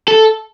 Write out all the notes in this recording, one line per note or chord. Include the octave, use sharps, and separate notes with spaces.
A4